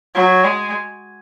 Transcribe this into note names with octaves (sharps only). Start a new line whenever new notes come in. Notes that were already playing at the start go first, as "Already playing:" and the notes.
F#3
G#3